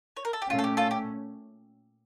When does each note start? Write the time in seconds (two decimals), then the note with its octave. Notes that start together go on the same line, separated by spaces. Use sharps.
0.17 C#5
0.25 A#4
0.33 A4
0.42 G4
0.50 A#2 A3 C#4 F4
0.59 A4
0.64 G4
0.77 F4 A4
0.91 G4